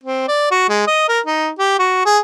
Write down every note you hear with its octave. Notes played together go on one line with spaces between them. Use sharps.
C4
D5
F#4
G#3
D#5
A#4
D#4
G4
F#4
G#4